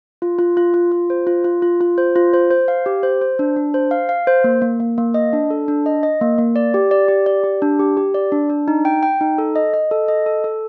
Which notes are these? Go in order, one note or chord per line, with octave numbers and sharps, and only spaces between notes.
F4
F4
F4
F4
F4
C5
F4
F4
F4
F4
C5
F4
C5
C5
F5
G4
C5
C5
D4
D4
C5
F5
F5
C5
A#3
A#3
A#3
A#3
D#5
D4
A4
D4
D#5
D#5
A#3
A#3
D5
G4
D5
G4
D5
G4
D4
G4
G4
D5
D4
D4
D#4
G5
G5
D#4
A4
D#5
D#5
A4
D#5
A4
A4